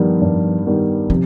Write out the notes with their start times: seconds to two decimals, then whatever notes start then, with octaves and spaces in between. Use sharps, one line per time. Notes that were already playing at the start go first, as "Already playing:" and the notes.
Already playing: G2 D#3 F3 G3 B3
0.21 G2
0.65 D#3 G3 B3
1.10 C3 F3